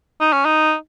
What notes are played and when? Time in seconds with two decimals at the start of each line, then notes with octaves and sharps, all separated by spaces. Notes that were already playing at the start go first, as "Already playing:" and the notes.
0.21 D#4
0.33 C#4
0.45 D#4